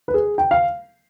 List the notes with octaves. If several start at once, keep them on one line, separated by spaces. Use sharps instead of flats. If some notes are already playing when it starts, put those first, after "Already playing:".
B4
G#4
G5
F5